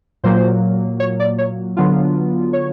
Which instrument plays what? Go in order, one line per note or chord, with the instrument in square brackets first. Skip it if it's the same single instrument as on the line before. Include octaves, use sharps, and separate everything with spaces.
[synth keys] A#2 F#3 A#3 C5
C#5
D5
C#5
D3 F#3 B3 D4 F4
C#5